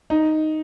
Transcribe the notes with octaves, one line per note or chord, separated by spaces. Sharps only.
D#4